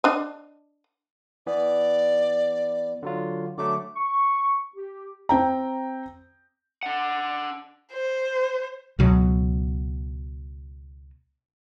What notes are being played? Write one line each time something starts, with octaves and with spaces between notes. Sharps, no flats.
D4 D#5
E3 B3 D5
D3 F#3 F4
D3 F#3 A3 D6
C#6
G4
C4 G5 A#5
D4 F#5
C5
C#2 B2 F#3